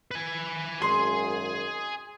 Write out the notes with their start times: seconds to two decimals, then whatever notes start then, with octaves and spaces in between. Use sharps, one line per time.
0.11 B4 G#5
0.82 G#1 F#2 G#3 G#4 C6